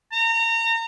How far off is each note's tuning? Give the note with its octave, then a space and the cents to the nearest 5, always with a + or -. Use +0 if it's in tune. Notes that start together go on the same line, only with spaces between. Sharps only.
A#5 -30